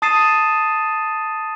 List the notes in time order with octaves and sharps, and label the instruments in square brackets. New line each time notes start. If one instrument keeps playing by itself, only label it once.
[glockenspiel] A5 D#6 A6 C7 D#7 E7